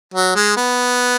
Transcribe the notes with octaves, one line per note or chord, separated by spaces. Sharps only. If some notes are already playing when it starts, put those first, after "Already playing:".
F#3
G#3
B3